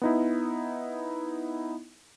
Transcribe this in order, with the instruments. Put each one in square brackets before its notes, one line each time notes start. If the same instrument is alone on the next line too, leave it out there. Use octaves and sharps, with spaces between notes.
[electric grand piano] B3 D#4 E4